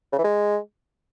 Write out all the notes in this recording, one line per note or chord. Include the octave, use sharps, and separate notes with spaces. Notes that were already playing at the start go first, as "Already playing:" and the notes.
C#3
E3
G#3